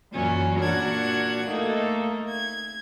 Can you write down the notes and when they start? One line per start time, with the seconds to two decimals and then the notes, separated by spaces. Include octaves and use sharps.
0.12 F#2 A#2 E3 F#3 C#4
0.58 A#2 D4 F#4 A#4 F#5 G#6
1.47 A3 A#3 D#4 A4
2.27 G#6